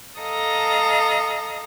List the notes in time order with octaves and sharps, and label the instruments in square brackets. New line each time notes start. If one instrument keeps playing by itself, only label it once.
[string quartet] A4 D#5 F5 A5 A#5 D#6